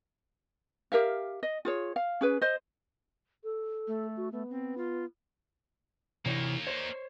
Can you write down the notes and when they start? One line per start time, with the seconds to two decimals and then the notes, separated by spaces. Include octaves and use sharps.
0.92 G4 A#4 E5 F5
1.43 D#5
1.65 F4 G#4 C#5
1.96 F5
2.21 C#4 G#4 B4
2.41 C5 D#5
3.44 A4
3.87 A3
4.17 F#4
4.32 A3 B3
4.50 C4
4.78 F4
6.26 C3 E3 A#3 D#4 C#5
6.67 C5 C#5